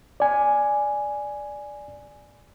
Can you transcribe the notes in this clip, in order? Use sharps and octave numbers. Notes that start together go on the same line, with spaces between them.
D5 G#5